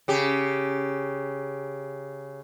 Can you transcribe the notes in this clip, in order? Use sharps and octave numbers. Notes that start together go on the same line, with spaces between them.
C#3 G4